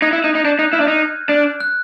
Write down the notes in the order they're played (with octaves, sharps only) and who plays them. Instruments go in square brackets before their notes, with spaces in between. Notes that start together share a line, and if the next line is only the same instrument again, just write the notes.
[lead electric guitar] D#4 [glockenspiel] F#6 G#6
[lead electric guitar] E4
[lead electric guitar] D#4 [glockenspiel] G6
[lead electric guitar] D#4
[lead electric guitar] D4 [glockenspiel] G6
[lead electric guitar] D#4 [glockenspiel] F#6
[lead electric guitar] E4 [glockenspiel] F6
[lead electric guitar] D4
D#4
D4
[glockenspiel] F#6